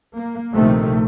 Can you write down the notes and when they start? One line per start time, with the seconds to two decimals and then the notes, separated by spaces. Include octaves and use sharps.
0.16 A#3
0.53 A#1 C3 D#3 A3